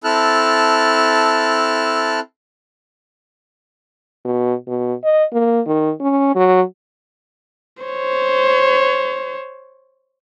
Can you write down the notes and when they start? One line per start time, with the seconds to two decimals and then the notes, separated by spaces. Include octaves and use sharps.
0.04 C4 E4 A4 A5 F6 F#6
4.25 B2
4.68 B2
5.04 D#5
5.33 A#3
5.66 D#3
6.01 C#4
6.36 F#3
7.83 C5 C#5